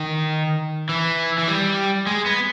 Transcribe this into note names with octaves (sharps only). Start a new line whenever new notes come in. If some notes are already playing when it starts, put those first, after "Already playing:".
Already playing: D#3
E3
E3
G3
G#3
B3